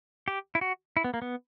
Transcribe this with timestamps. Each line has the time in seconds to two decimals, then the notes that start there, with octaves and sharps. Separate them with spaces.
0.28 G4
0.55 E4
0.61 F#4
0.97 E4
1.04 B3
1.14 A#3
1.22 B3